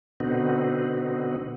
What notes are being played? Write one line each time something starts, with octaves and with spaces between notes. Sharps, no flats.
B2 D3 B3 C4 D#4 F#4